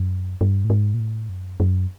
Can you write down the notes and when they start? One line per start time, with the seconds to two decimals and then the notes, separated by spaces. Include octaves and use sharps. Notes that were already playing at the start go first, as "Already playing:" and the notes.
Already playing: F#2
0.41 G2
0.64 A2
0.70 G#2
0.94 A#2
1.00 A2
1.29 F#2
1.60 F#2